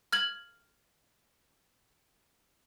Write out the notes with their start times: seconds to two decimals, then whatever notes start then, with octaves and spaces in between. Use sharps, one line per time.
0.13 F6 G#6 F#7